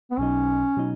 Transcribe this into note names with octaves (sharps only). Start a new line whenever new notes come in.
B3
B1 B2 F#3 C#4 D#4
B2 F#3 D#4